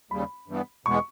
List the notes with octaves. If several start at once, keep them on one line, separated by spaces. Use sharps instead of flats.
D#2 C#3 G3 B5
G2 E3 G3 B3
E2 B2 G#3 B3 C#6